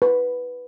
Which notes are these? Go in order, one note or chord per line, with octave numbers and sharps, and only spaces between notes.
B4